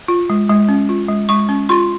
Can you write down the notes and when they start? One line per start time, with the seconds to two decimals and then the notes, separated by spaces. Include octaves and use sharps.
0.08 F4
0.30 G#3
0.49 G#3
0.69 C#4
0.89 F4
1.08 G#3
1.29 G#3 C#6
1.49 C#4
1.69 F4 C6